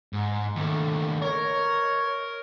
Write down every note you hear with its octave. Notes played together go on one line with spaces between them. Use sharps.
G#2
D#2 A3
A#4 C#5